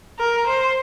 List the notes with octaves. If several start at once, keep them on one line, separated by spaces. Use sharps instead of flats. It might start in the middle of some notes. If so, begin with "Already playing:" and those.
A#4
C5